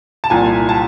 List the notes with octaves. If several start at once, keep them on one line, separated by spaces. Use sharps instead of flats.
A5
C2 A#2 F3 G#5
A5